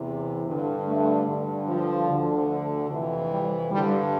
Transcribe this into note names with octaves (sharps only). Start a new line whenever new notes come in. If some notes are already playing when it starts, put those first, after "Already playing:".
Already playing: E2 C3 E3
G2 D3
A3
G2 D3
F3
D2 D3
F2 C3 E3
G3
G2 D3 G3